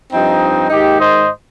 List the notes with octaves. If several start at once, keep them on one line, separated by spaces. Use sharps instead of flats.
G2 F3 C4 D#4
G#2 D#3 D#4 G4
C5 D#5